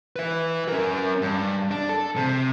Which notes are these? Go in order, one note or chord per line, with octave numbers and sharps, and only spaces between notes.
B4 E5
C#4 A#4
G2
D4
A4
C3